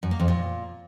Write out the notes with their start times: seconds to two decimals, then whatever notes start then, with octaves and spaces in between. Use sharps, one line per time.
0.03 F#2
0.11 A#3
0.20 F2
0.28 A#2